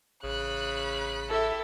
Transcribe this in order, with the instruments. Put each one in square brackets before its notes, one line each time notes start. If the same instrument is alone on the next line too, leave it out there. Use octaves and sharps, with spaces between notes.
[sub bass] A1 [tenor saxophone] C#3 [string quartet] B5 F#6
[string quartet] E4 G4 E5 [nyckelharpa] A4